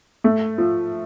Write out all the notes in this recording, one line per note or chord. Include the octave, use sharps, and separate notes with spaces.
A3
F3